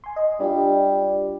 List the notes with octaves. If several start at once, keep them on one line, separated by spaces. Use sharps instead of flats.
G#5 C6
D#5
G3 D4 F4 G4